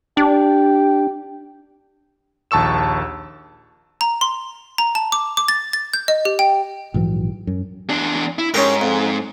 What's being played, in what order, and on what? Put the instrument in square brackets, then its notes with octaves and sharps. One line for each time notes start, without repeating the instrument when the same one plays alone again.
[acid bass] D4 [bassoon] G4
[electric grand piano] A#1 D#2 A5 C#6 E6 E7
[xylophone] A#5
C6
A#5
A5
D6
D6
A6
A6
G6
D#5
G4
G5
[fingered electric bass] A#1 G#2 E3 F#3
F#2
[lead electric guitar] E2 D4
E4
[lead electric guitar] G#2 [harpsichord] C#4 G4 A#4
[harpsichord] F2